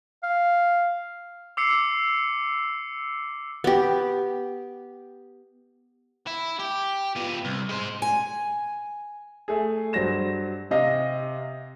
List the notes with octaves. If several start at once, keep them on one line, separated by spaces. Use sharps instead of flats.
F5
D6 E6 C7 C#7
B3 G4
E4
G4
F3 B3
C2
G#3 C5
G#5
A3 G#4
G2 F#3 C5 A#6 E7
C3 D#5 F5